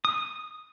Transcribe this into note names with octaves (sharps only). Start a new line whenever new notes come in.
D#6